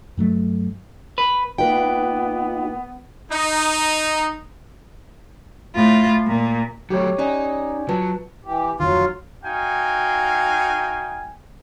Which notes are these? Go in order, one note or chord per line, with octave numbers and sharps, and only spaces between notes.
G2 F#3 A3
B4
A#3 B3 D#4 F4 B4 G5
D#4
A2 F4
A#2
F#3 A3 G4 C#5
C#4 D#4 D5 G#5
F#3 F4 B4 A5
E3 G4
D1 F2 D#3 F#3 F4
D#4 F#4 F5 G5 G#5